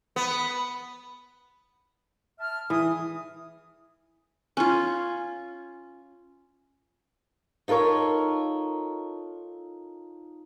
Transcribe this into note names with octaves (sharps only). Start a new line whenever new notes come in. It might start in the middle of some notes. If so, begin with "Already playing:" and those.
B3
E5 A5 F6
E3 G#4 D#6
C#4 F4
D#4 F4 A4 A#4 C#5